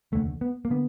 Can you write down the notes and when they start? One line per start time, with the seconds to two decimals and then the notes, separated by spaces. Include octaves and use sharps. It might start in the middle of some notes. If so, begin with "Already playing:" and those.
0.12 F1 D#2 D3 A3
0.41 B3
0.65 A#3
0.70 D3 B3